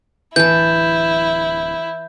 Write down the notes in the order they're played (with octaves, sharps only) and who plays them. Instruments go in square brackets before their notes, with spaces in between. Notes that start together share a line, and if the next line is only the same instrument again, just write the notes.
[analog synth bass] D1 [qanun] E3 A5 [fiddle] E4 [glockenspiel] G6